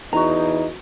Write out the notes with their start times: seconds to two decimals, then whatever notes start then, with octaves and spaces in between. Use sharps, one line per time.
0.13 E2 D#4 F#4 A#5